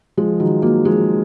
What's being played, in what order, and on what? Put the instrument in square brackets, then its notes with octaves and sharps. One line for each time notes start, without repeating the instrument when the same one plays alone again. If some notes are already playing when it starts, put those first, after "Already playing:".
[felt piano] F3 G#3
D#3 F#3
F#3 A#3
F3 G#3